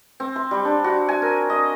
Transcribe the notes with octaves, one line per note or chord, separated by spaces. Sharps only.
C4
C6
G3
D4
F#4
G#5
A#4
D#5